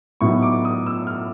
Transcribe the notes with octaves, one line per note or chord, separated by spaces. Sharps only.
A2 F#3 B3 D#4 C#6
D6
D#6
E6
F6